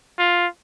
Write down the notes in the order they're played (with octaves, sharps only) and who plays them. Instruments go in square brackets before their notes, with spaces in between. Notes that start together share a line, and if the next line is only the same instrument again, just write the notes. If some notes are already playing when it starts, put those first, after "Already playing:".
[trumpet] F4